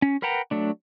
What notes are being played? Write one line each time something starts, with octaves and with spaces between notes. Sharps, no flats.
C#4
A#4 B4 F#5 G5 A#5
F#3 A3 D4